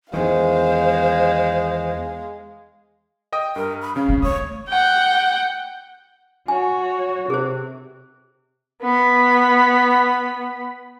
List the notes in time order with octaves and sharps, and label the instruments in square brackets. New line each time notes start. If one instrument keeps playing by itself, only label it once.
[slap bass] E2 D#3 [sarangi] G#3 [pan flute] C5 [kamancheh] F5
[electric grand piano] D#5 G5 D#6
[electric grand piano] G2 [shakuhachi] A#4
[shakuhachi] B5
[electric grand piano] C#3 C#4 [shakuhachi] F5
[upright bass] C4
[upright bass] A3 [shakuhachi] C#5 [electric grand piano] D#6
[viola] F#5 G5
[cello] F#4 C#5 [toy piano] G#5
[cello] C3 [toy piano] G#4 C5
[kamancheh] B3 B5